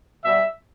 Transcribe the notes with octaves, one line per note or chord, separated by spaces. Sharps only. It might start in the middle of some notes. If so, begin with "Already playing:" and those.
B2 G3 E5